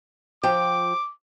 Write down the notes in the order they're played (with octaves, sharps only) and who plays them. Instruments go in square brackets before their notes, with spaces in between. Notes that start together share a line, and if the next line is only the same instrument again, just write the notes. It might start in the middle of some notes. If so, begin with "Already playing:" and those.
[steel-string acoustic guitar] F3 G5 [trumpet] D6